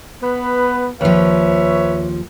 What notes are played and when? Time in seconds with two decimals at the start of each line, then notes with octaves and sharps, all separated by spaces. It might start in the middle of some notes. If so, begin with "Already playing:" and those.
0.22 B3 B4
1.01 D#2 F3 B4 C#5 E5